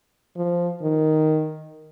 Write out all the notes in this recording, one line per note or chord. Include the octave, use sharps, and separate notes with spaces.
F3
D#3